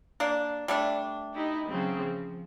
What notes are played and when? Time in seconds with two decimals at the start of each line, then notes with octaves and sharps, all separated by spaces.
0.20 A#3 D4
0.68 G3 A3 D4
1.34 D#4 E4 G4
1.68 C#3 F#3 C4
2.03 F3